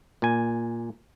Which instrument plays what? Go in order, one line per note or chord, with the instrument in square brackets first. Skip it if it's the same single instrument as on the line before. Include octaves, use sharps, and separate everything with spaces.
[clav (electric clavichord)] A#2 G#5